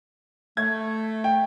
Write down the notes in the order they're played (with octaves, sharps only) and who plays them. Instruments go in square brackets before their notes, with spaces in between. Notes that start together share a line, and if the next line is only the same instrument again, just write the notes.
[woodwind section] A3 [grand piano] G#6
[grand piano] G5